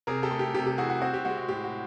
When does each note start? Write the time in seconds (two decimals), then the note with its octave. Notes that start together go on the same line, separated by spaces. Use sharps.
0.07 C3 G#4 A#4
0.23 G4 A4
0.31 A3
0.39 G4
0.54 C3 G4
0.67 G4
0.78 E3 F#4 G#4
0.90 F#4
1.01 C4 F#4
1.13 G4
1.25 G#3 F#4
1.37 F#4
1.49 A2 G4
1.64 F#4